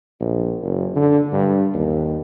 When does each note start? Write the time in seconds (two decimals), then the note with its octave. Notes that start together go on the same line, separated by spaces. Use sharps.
0.20 A#1
0.62 F#1
0.95 D3
1.32 G2
1.74 D#2